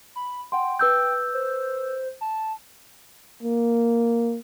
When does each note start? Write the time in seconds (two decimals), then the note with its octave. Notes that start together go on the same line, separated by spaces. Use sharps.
0.16 B5
0.52 F#5 G5 C6
0.79 B4 E6 G6
1.34 C5
2.21 A5
3.43 A#3